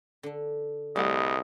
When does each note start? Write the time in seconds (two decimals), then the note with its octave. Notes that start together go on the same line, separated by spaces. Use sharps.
0.23 D3 D4
0.96 C2 G3 A3 G#4 D#5 F#5